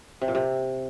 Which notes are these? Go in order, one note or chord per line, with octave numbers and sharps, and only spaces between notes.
C3
A#2
C3